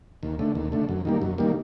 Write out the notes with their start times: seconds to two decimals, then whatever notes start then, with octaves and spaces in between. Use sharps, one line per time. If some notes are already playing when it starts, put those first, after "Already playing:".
0.23 D#2
0.39 D3 A3
0.55 D#2
0.72 D3 A3
0.89 F#2
1.05 D#3 G3 A#3
1.22 F#2
1.38 D#3 G3 A#3